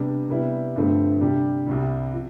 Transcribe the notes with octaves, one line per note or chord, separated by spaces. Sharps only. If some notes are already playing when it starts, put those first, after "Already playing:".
Already playing: C3 G3 B3 D4
C3 G3 B3 E4
G2 D3 F3 A3 C4
C3 G3 D4 G4
C2 C3 G3
F3